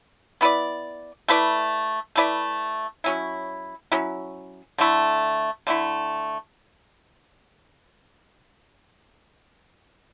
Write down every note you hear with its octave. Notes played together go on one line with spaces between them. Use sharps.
B3 E4 B4 D5
A3 E4 B4 D5
A3 E4 B4 D5
F#3 C#4 E4
F#3 C#4 E4
D3 A3 E4
D3 A3 E4